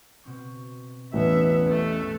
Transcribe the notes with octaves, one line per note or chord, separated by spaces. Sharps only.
B2 C4 C#6
A1 E2 E3 B3 C#4 E5
E2 A3 F#6